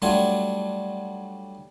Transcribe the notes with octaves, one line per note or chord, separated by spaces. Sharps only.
F#3 G3 A3 D4 F4 G#5